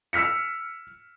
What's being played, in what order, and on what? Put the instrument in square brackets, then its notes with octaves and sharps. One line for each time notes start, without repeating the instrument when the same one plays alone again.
[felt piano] E6 F6 B6 C#7